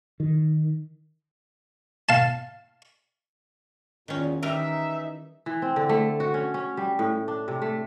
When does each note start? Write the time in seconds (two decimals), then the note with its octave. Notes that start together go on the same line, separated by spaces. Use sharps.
0.20 D#3
2.09 F5 A5
4.08 E2 A#2 D#3 C#4
4.43 D#3 E3 G3 D#4 A#4 E5
5.46 E3
5.62 C4
5.76 D3
5.89 A3
6.20 F#4
6.34 C#4
6.54 C#4
6.77 G3
6.99 A2
7.28 D4
7.48 C3
7.62 A3